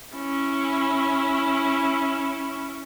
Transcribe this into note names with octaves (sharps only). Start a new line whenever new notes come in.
C#4 E4